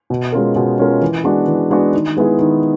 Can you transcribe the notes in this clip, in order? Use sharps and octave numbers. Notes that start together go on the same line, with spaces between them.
B2
G#3 C#4 F4 A#4
B2
G#3 C#4 F4 A#4
E3
G#3 B3 D4 F#4
E3
G#3 B3 D4 F#4
D#3
G#3 B3 E4 G#4
D#3